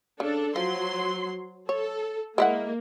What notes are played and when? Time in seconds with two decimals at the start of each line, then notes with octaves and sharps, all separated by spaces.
0.20 C#3 D4 A4
0.56 F3 F#3 C6
1.69 A4 C#5
2.38 G#3 A#3 E4 F#5